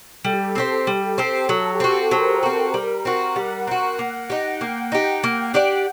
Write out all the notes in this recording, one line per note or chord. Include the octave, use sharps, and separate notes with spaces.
G3 A4
G4
A4
C4 G4 C5
G3
C4 G4 C5
F#3 A4
G4
C4 F#4 A4
F#3 C5
A#4
A4
A#4
C4 F#4
G3
C4 F#4
G3 F#5
C4 F#4
A#3
D#4 G4
A#3 G5
D#4 G4
A#3
D4 G4 D5